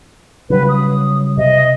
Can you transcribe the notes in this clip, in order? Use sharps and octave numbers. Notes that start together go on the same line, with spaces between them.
C#3 F#3 G3 B4
D#6
C3 D#5